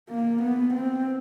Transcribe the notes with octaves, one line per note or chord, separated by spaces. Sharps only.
A#3
B3
C4